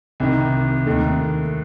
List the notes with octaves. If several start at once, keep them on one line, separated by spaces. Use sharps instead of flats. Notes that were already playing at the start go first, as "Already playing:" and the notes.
C2 C3 D#3
D#2 D#3 A3